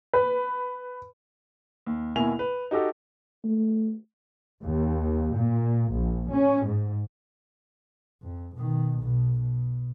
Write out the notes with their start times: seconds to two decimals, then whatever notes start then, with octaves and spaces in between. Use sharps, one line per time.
0.13 B4
1.86 D#2
2.16 D#2 B2 E4 A#4 G#5 F7
2.39 B4
2.71 D#4 F#4 G4 A4
3.44 A3
4.64 D#2
5.36 A#2
5.93 A#1
6.32 C#4
6.66 G#2
8.23 F2
8.57 B2 D#3
8.99 B1 B2
9.39 B2